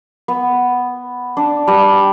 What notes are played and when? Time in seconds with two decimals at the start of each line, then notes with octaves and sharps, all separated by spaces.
0.28 B3
1.37 D4
1.67 G3